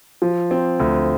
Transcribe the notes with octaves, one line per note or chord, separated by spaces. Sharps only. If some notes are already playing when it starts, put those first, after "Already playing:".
F3
C4
D2